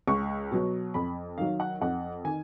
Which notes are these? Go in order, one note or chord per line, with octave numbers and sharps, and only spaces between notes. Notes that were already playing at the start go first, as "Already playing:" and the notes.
C#2 C#6
B2 F#3
F2 B5
D#3 F#3 F5
F#5
F2 F#5
D#3 G#5